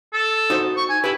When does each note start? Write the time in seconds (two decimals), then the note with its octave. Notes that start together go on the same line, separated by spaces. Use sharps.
0.13 A4
0.50 D#4 F#4 C5
0.77 C#6
0.89 G#5
1.04 E4 G4 B4